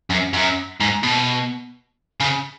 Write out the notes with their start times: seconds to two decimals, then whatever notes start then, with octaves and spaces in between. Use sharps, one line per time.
0.10 F#2
0.33 F#2
0.80 G#2
1.03 B2
2.20 C#3